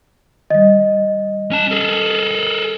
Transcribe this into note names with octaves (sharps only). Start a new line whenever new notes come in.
D#3 G3 D#5
C#4 A5
G#4 A4